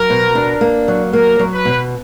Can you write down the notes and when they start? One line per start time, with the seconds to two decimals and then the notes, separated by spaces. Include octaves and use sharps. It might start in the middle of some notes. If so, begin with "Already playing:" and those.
Already playing: F#3 A#4
0.10 B2
0.35 D4
0.61 A#3
0.88 F#3
1.13 A#3 A#4
1.39 F#3
1.52 B4
1.65 B2